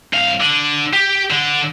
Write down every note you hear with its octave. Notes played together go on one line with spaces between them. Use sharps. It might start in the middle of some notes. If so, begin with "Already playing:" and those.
C2 F5
D3
G4
D3